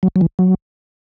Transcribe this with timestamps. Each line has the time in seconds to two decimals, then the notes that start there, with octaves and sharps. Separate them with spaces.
0.03 F#3
0.16 F#3
0.21 E3
0.39 F#3